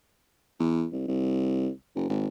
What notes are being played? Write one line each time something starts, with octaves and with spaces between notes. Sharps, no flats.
E2
C2
C2
F#1
G#1